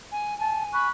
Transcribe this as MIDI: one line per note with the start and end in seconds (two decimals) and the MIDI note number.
0.12 0.37 80
0.38 0.87 80
0.38 0.62 81
0.72 0.89 83
0.72 0.89 85
0.72 0.89 90